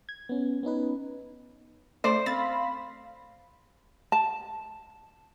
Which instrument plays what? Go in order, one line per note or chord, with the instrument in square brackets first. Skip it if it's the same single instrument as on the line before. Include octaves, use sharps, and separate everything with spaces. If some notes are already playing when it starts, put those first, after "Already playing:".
[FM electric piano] G#6
B3 C#4
B3 C#4 D#4 B4
[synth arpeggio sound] A3 D5 [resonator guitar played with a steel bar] C5
[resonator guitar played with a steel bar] C4 [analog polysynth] F5 B5 [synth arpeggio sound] A6
[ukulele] A5